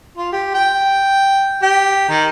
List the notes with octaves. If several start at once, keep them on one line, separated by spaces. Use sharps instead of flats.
F4
G4
G5
G4
D#3